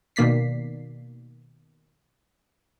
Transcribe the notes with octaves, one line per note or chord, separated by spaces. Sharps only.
B2 D#3 A#3 D5 B6 C7